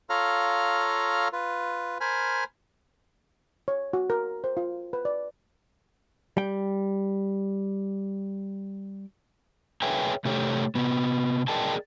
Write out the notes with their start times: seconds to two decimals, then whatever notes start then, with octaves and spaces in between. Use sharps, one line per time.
0.10 F4 A4 C#5 F5 A#5 F6
1.33 F4 B4
2.01 A#4 C5 G#5 B5 F6
3.68 C#5
3.93 F#4
4.10 A#4
4.44 C5
4.57 F4
4.93 B4
5.05 D5
6.37 G3 G5
9.82 G#4 B4 C#5 E5 G5 G#5
10.25 C3 A3 G4 A4 C#5
10.75 C3 B3
11.48 G#4 A#4 D5 D#5 G5 A5